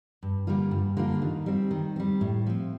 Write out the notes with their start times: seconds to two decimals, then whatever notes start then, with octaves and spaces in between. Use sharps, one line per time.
0.23 G2
0.47 D3 G3 A#3 F4
0.71 G2
0.97 D3 G3 A#3 F4
1.22 D#3
1.46 G3 C4
1.71 D#3
1.96 G3 C4
2.21 A2
2.46 F3 C4